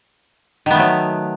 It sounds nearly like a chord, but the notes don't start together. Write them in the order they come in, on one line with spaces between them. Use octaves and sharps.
D#3 B3 A3 F#3